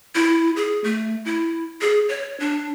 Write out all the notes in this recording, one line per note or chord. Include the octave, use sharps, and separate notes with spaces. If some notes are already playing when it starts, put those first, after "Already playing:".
E4
G#4
A3
E4
G#4
C#5
D4